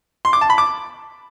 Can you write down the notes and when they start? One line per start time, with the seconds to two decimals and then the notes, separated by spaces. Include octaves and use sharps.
0.25 C6
0.33 D6
0.41 A5
0.50 B5
0.58 D6